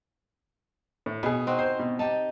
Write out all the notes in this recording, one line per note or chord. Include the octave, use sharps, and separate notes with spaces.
A2
B2 B3 G#4
C4 D#4 F#4
C5
B2
D#4 G4 A5